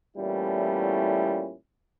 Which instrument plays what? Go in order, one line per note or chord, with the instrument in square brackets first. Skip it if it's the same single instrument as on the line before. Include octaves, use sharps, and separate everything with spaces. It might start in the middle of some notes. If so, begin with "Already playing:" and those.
[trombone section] E2 A#2 G3 A3 C#4 E4